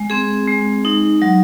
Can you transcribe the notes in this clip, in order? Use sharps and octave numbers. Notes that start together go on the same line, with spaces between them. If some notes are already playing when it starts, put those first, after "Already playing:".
Already playing: G#3
C4 G#4
G#3
D#4
F#3